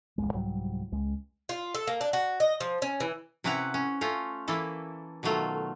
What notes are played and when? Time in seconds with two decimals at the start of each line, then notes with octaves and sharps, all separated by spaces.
0.18 D1 A1 D#2 G#3
0.34 C2 G#2 F#3 G3
0.92 C#2 G#3
1.49 F4
1.74 A4
1.87 A#3
2.01 D4
2.13 F#4
2.40 D#5
2.60 F3
2.82 C#4
3.00 E3
3.44 C3 C#4 E4 B4 F#5 A#5
3.74 C#4
4.01 A3 C#4 F4
4.48 E3 A#3 E4 A4
5.23 B2 D#3 F#3 A3 F4